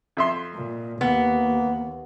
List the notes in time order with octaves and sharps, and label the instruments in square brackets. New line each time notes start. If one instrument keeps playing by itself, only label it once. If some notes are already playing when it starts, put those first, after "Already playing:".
[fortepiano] F2 E5 C6
[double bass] A#2
[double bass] D#2 [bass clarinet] A#3 [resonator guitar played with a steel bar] B3